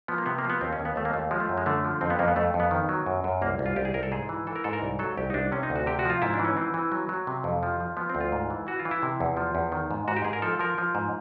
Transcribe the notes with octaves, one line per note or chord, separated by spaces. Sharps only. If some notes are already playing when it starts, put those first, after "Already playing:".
F3 B3
A#3
C3 B3
A#3
F3
B3
D#2 C4
C#4
D#2
B3
D#2 A3
A#3
D#2 A3
F3 G#3
A3
F#2
G#3
D3 A3
F3
F2 C4
B3
F2 A#3
B3
F2 A3
F2
B3
D#3
F#3
F#2
F#2
C2 A#3
C2
F4
C2 G4
G#4
C2 A#4
A4
G#2 G#4
E3
E3 A4
A#4
G#2 A4
A#4
C2
F#3 A4
C2 G4
D#4
C2 D4
C3 C#4
D#4
D2
F#4
C3 G4
F#4
F3 F4
G#2 E4
D4
E3
C#4
E3 C4
E3
F#3
F#3
C3
F2
F3
F3
F3 B3
C4
D2
F4
G#2
E3
E3 F#4
F4
E3
E4
C3
E2
F3
E2
D#3
G#2
G#2 F#4
G4
G#2 G#4
A#4
F3 A4
F3 A#4
F3
G#2